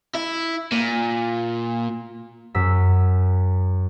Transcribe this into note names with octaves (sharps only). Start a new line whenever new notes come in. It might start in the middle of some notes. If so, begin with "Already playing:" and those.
E4
A#2
F#2 E6 B6